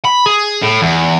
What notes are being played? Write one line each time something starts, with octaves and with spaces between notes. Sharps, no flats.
B5
G#4
A2
E2